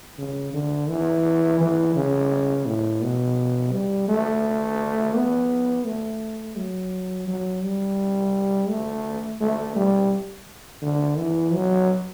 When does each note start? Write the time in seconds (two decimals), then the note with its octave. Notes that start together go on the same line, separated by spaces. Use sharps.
0.18 C#3
0.53 D3
0.89 E3
1.60 E3
1.95 C#3
2.66 A2
3.02 B2
3.73 G3
4.08 A3
5.15 B3
5.86 A3
6.56 F#3
7.27 F#3
7.63 G3
8.69 A3
9.41 A3
9.76 G3
10.82 D3
11.18 E3
11.54 F#3